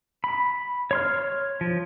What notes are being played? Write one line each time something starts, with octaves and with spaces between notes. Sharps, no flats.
B5
C#5 C6 F6
F3